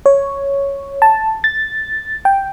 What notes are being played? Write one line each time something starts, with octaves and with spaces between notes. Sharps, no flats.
C#5
A5
A6
G5